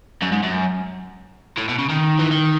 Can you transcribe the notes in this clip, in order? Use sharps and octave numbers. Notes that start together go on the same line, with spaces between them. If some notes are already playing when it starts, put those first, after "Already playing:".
F#2
G#2
F#2
A2
B2
C#3
D#3
E3
D#3